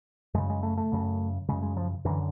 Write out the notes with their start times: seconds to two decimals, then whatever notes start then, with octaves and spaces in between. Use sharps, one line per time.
0.34 F#2 C#3 G#3
0.50 G#3
0.63 A3
0.77 A3
0.92 F#2 C#3
1.48 F#2 C#3 G#3
1.62 G#3
1.77 F3
2.05 F#2 D3 E3